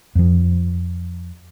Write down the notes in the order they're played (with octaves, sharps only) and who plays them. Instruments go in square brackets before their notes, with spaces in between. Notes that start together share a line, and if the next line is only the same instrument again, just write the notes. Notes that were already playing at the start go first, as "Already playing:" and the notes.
[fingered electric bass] F2 F3